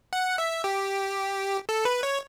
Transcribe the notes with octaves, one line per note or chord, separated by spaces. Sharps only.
F#5
E5
G4
A4
B4
C#5